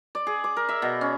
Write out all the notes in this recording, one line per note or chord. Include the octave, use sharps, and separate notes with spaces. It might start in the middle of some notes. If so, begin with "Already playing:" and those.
D5
G#4
D6
A#4
E5
B2
C#4